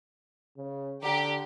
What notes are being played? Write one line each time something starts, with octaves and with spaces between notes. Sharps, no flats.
C#3
D3 G4 A#5